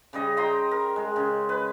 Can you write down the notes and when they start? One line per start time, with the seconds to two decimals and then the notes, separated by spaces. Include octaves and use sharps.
0.13 C#3 G3 D#5
0.37 D#5 G5 A#5 C6
0.71 A#4
0.96 G#3
1.16 C#3
1.49 B4